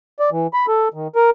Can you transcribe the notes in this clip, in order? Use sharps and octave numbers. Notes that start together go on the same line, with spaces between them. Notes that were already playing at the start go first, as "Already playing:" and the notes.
D5
E3
B5
A4
D#3
A#4